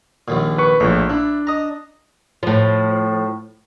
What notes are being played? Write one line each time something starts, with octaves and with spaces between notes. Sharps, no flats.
A#1 D#2 A#2
B4 C#6
A#1 A2 F3
D4 E4
D#5 A#5
A2 F3